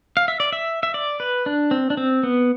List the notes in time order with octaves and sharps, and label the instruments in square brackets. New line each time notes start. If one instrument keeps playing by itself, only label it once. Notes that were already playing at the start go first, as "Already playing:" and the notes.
[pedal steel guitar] F5
E5
D5
E5
E5
D5
B4
D4
C4
D4
C4
B3